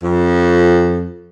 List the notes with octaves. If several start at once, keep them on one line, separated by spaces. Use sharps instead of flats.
F2